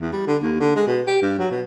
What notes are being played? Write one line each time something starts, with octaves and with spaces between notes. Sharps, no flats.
E2
G3
D3
D#2
D3
G#3
B2
G4
G2
F#3
B2